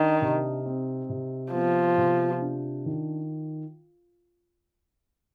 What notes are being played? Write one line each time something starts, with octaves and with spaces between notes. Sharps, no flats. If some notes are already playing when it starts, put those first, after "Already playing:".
Already playing: D#3 D4
C3
C4
C3
F3 B3
C3
D4
D#3